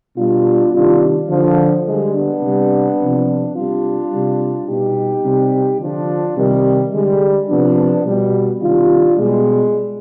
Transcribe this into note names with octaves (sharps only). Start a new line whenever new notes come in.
B2 G3 D4 F4
C3 D#3 G3 D4 F4
D3 F3
D3 G3 G#3
B3 D4
C3 G3
C3 F3
C3 G3 D4 F4
C3 G3
B2 G3 D#4 G4
C3 G3
D3 F3 D4 F4
C3 D#3 G3
D3 G3 G#3
C3 F3 B3 D4
B2 G3
C3 D#3 G3 D4 F4
B2 G3 G#3